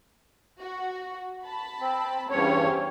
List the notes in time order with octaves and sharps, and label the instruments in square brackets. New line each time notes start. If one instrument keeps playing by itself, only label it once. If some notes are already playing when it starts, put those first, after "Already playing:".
[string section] F#4
A5 B5
[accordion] C4
[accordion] E2 G2 C#5 [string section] C#4 G4 C5